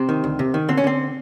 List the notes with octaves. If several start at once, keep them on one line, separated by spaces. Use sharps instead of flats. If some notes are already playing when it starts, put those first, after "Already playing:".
Already playing: C3 C4
D#3
D2
C3
D#3
D3 C4
C#4
D3 C4